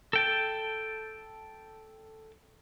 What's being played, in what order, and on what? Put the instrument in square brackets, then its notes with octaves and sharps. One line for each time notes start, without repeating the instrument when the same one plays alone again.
[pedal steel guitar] A4 G5 A5